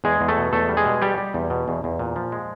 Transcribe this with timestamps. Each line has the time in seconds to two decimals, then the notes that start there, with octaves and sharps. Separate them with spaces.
0.04 E2 G#3 G#4
0.21 E2
0.28 A3 A4
0.37 B2
0.53 E2 A3 A4
0.69 G3
0.77 G#3 G#4
0.85 B2
1.02 G3 G4
1.18 G3
1.34 E2
1.50 B2
1.68 E2
1.84 E2
1.99 A#2
2.16 F3
2.32 G#3